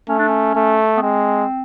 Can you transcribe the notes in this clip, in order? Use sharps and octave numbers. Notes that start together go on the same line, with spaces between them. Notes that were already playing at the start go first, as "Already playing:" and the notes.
A3 C#4
D4
C#4
A3
B3
G#3 C4